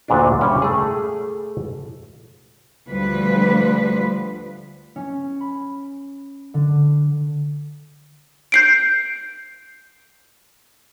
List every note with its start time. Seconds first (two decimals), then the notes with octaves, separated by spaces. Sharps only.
0.08 D2 A#2 D4
0.41 G3 C#4 G4
0.62 A3 G#4
2.89 D2 F3 G3 B4
4.96 C#4
5.41 B5
6.54 D3
8.52 G6 C7 D7